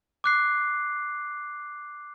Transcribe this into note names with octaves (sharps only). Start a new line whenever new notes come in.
D6 F#6 C7